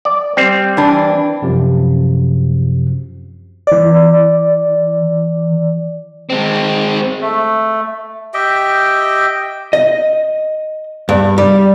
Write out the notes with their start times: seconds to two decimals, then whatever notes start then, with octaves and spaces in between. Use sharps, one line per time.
0.05 D5
0.37 G3 C4
0.77 E3 D4
1.42 F#2 C3 F3
3.67 E3 D5
6.30 G#3 C4
7.22 A3
8.34 G4 D#5 E5 G5
9.73 D#5
11.09 G2
11.38 G3